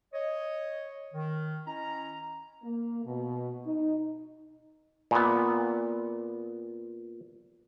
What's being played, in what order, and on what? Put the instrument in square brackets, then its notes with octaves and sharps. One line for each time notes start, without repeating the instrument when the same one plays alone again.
[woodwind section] C#5 D#5
D#3
C#4 E4 D#5 A#5
[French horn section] A#3
B2
D#4
[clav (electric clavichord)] A#2 B3